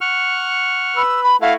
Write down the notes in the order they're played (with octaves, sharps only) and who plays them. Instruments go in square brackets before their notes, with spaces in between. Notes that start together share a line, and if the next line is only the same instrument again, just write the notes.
[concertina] F#5 C#6 F6
[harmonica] B4 [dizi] E6
[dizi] B5
[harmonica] A3 E4 F#4 [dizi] F5